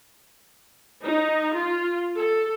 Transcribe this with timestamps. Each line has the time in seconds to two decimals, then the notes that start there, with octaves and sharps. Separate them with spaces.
1.05 D#4
1.55 F4
2.16 A4